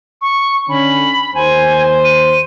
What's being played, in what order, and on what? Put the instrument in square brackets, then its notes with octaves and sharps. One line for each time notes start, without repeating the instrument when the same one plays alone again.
[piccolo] C#6
[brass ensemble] D3 C#4 [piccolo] B5
[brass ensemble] D#2 C5 [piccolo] G#5
[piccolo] D#7